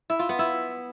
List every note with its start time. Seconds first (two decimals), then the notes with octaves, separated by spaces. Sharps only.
0.10 E4
0.19 F4
0.29 B3
0.39 E4